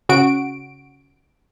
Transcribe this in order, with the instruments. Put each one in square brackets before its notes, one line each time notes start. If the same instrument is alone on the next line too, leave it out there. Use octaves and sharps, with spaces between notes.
[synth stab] C#3 F#4 D7